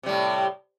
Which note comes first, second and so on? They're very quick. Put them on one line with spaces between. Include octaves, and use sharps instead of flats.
C3 G3 A2